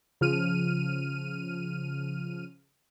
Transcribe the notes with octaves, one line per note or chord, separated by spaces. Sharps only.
C#3 F3 F6 D#7